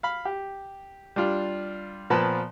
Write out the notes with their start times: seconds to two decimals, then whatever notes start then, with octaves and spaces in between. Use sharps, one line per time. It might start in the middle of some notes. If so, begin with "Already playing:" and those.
0.03 F5 B5
0.25 G4
1.16 G3 D4 F4
2.10 A#2 F3 B3 B4 A5